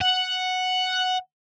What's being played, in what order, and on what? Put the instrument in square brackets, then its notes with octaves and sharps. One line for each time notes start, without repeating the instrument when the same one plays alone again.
[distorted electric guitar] F#5